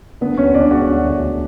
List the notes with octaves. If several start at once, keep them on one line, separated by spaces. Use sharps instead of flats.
D3 B3 B4
D2 C#4 C#5
C#5
D3 D4 D5
G#3 F#4 F#5
D2
D2
D2